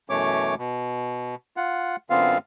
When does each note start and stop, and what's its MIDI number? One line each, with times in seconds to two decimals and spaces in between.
0.10 0.55 42
0.10 0.55 47
0.10 0.55 52
0.10 0.55 57
0.10 0.55 73
0.10 0.55 86
0.58 1.35 47
1.57 1.96 65
1.57 1.96 78
2.10 2.38 42
2.10 2.38 50
2.10 2.38 59
2.10 2.38 60
2.10 2.38 65
2.10 2.38 77